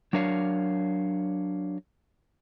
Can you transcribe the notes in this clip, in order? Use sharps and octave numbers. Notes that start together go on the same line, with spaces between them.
F#3 D4 A#4 C#5 F5